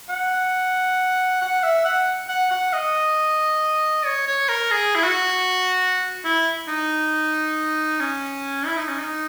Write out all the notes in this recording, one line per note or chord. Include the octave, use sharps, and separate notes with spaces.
F#5
F#5
E5
F#5
F#5
F#5
D#5
C#5
C#5
A#4
G#4
E4
F#4
E4
D#4
C#4
E4
D#4
C#4
D#4